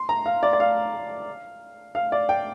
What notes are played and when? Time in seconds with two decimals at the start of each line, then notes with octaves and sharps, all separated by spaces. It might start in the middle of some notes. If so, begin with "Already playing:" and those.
Already playing: C6
0.09 A#5
0.26 F5
0.43 D5
0.53 D5
0.60 F5
1.95 F5
2.12 D5
2.29 G5